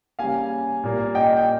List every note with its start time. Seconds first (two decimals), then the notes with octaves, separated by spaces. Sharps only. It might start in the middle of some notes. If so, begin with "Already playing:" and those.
0.19 C#3 G3 A#3 F5 G#5
0.84 A#2 G3 A#3
1.15 D#5 G5
1.37 G5